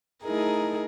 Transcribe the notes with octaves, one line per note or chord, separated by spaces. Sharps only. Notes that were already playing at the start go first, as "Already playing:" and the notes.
A3 D#4 E4 G#4 A#4